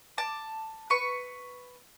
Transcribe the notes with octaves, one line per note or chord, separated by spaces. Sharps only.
A5 D6
B4 C#6